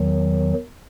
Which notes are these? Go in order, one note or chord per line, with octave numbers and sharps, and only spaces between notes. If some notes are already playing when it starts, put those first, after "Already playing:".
Already playing: E2 D#3 F#3